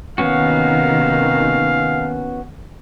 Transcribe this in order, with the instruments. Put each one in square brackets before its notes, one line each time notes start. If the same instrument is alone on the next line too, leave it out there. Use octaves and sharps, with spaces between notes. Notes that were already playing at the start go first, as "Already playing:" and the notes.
[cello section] C3 D#3 A#3 [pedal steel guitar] B3 C#4 F#4 [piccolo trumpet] F5